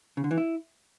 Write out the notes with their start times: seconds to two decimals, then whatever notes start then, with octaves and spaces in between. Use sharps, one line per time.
0.17 C#3
0.24 D3
0.31 E3
0.38 E4